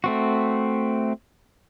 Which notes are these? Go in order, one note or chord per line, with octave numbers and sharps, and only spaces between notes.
A3 C4 F#4